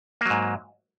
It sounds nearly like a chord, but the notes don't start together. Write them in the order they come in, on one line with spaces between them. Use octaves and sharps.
A#3 F#3 G#2